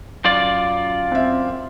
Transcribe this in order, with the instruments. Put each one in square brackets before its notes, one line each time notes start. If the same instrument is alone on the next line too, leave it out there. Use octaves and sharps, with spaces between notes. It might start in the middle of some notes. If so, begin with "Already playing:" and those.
[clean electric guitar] F#2 F4 D5
[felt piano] C4 E5